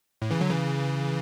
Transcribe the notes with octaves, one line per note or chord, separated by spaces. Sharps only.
A2
C#3 E3
D3 F#3
C#3 E3